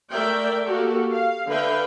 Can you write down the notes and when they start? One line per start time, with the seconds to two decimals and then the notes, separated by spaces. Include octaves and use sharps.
0.11 A3 A#4 D5 E5 G5
0.64 A#3 F#4 G4 A4
1.12 F5
1.48 D3 B4 E5 F5 G5